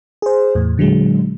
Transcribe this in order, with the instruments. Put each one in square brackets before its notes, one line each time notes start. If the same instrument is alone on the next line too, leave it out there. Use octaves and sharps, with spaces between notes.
[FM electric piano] G#4 C5
E2 A2
A#2 D3 F#3 G#3